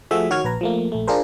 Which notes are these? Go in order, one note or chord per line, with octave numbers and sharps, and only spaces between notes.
F3 A3 F#4 G#4 E5
D#3 F#4 C#5 F6 G#6
A#1 B4 A#5
F3 A3 A#3
A#1 A3
D4 F4 G#4 A#4 C5